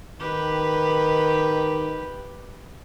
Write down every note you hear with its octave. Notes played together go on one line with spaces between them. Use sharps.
D#3 G4 B4